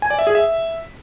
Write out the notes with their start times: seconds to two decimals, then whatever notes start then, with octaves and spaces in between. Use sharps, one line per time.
0.02 G#5
0.10 D5
0.19 E5
0.27 G#4
0.35 E5